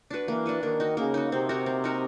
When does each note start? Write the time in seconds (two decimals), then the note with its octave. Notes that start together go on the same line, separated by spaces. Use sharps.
0.11 D4 F#4 B4
0.28 E3 A#3
0.46 D4 F#4 B4
0.63 D#3 A#3
0.80 D#4 F#4
0.97 C#3 A#3
1.14 D#4 F#4
1.32 C3 C4
1.49 D#4 F#4 A#4
1.66 C4
1.84 D#4 F#4 A#4